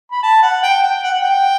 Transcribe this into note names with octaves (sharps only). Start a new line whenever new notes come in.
B5
A5
F#5
G5
G5
F#5
F#5
G5